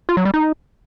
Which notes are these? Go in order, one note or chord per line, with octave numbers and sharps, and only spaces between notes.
F4
F#3
G3
D#4